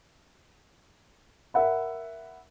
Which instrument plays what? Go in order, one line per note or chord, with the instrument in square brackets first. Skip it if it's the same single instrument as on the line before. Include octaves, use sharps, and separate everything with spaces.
[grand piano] A#4 E5 F#5 B5